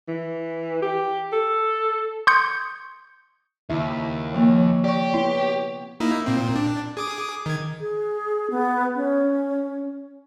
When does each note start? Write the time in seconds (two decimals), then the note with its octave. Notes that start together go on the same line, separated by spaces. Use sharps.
0.08 E3
0.82 G4
1.32 A4
2.27 C6 C#6 D#6 G6 C#7
3.70 D#2 C#3 E4 E5
4.34 F3 A#3 C#5
4.84 G4 D5 C#6
5.14 B3 E4
6.00 A#3 D#4 E4
6.26 A#2 C4
6.56 D4
6.97 G#4 D6 D#6
7.46 D#3 G#6
7.81 G#4
8.51 B3
8.96 C#4